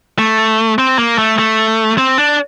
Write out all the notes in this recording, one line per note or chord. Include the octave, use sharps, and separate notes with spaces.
A3
C4
A#3
A3
A3
C4
D4